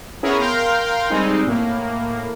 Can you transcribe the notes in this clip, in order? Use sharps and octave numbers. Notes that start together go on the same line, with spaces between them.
B3 C#4 E4 G#4 A#4 C#5
A#4 F5 G5 C6 F6 G6
G3 G#3 C4 D#4
A2 A#3